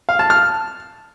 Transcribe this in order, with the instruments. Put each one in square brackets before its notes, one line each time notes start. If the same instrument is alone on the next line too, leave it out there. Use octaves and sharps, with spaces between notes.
[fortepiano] F5
A5
F6